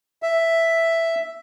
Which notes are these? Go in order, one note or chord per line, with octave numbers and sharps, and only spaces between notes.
E5